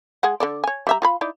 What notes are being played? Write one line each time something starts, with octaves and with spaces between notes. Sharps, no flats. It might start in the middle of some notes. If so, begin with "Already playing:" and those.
G#3 G#4 F#5
D3 A4 D5
C#5 G#5
G3 E5 A#5
F4 F5 B5
D#4 E4 D5